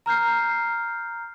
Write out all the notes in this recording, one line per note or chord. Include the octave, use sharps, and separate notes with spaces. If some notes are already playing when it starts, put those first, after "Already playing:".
A#5 F6 G6 C7